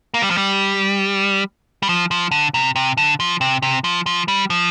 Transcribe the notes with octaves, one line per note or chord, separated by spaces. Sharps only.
A#3
G3
F3
G3
G3
F3
F3
D3
C3
C3
D3
F3
C3
C3
F3
F3
G3
F3